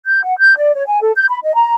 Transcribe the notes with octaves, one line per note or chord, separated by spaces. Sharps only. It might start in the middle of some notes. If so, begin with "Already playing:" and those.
G6
F#5
G6
D5
C#5
G#5
A4
G6
B5
D#5
A#5